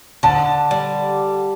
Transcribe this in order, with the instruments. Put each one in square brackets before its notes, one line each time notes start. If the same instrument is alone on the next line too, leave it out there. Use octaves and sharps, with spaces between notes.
[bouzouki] D3 [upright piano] A5
[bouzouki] G3